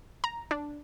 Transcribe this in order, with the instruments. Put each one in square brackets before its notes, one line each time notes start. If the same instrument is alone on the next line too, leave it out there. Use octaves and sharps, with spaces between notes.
[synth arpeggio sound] A#5
D4